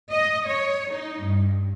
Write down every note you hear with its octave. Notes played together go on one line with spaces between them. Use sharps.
D#5
C#5
D#4
G2